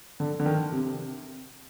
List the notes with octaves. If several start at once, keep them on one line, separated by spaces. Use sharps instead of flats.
D3
D3
D#3
C3